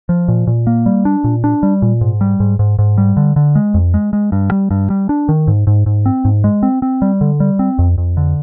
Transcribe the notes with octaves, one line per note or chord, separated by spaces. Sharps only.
F3
A#2
A#2
A#3
G3
D4
A#2
D4
G3
A#2
G#2
G3
G#2
G#2
G#2
G3
D3
D3
G#3
F2
G#3
G#3
G2
G3
G2
G3
D4
D#3
G#2
G#2
G#2
C4
G#2
G#3
C4
C4
G3
D3
G3
C4
F2
F2
D3